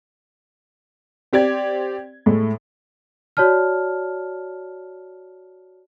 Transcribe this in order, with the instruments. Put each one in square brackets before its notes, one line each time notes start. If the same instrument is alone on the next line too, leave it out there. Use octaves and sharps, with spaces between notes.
[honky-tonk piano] C4 G4 D5 G#6
A2 G#3 A3
[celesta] F#4 C#5 D5 A5 F6